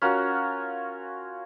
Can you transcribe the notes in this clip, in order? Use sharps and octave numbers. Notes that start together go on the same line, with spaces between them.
C#4 F4 F#4 A#4